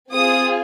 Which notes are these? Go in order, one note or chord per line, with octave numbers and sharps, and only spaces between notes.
C4 F4 G#4 D#6